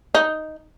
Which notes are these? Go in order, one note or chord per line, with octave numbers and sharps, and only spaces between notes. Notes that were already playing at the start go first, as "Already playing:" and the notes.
D#4